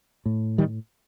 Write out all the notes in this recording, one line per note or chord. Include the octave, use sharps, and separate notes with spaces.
A2
D#3 G3